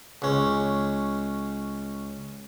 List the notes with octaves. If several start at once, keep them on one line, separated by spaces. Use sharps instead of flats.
C#2 C#4